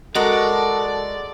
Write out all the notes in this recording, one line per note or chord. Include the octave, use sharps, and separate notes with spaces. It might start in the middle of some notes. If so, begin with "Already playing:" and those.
G#3 F#4 A4 A#4 D5